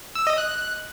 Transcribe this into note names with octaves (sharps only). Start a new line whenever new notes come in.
E6
D#5
F#6